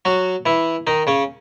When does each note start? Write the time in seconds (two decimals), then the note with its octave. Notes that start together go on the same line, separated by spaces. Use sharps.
0.05 F#3 F#4
0.46 E3 E4
0.87 D#3 D#4
1.07 C#3 C#4